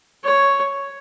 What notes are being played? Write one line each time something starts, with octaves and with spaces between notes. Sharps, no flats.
C#5